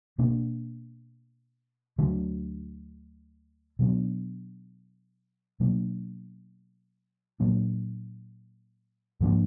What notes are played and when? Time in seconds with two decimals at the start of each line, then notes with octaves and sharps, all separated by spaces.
0.18 B2 A#3 D4
1.98 D2 D3 F#3 D4
3.79 B2 F#3 B3 D4
5.60 B2 F#3 A#3 D4
7.40 A#2 F#3 A#3 D4
9.21 G#2 F3 A#3 D4